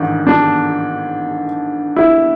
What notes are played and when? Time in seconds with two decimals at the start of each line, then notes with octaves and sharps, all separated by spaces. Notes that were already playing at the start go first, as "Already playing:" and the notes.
Already playing: A1 G#2 D#3 D4
0.27 D4
1.96 E4